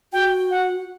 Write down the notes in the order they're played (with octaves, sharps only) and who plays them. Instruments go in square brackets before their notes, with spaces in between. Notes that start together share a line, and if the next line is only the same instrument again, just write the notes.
[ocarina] F#4 [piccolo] G5
[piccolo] F#5